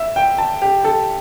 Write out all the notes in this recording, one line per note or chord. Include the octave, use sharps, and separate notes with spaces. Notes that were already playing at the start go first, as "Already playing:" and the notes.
Already playing: E5
G5
A5
G4
A4